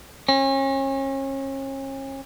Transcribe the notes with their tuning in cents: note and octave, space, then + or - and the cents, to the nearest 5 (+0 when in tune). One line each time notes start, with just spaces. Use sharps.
C#4 -35